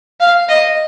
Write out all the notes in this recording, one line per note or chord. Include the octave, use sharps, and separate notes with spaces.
F5
D#5